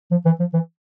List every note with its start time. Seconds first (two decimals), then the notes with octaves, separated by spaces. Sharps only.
0.11 F3
0.25 E3
0.40 F3
0.54 E3